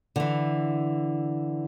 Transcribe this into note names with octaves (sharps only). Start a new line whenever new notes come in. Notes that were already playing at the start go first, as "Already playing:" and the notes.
D3 E3